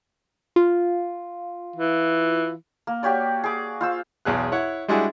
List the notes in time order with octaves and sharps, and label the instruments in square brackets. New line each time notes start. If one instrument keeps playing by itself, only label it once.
[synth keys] F4
[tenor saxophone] E3
[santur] A#3
F#4 G4 C#5 D5
G#4 D6
F4 C5 E6
[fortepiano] B1 E2 G#4 F#6
E4 C#5 F#5
G3 G#3 D4 E4 F#4 G#4